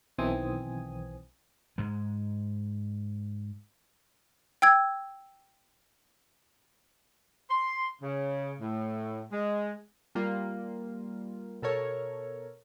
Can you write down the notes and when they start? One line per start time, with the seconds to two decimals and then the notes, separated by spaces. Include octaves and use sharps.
0.18 B1 D#3 E3 C4 G#5 D#6
1.78 G#2 G#3
4.62 G5 E6 G#6
7.50 C6
8.02 C#3
8.61 A2
9.32 G#3
10.15 G3 A#3 F4
11.62 B2 A4 A#4 C#5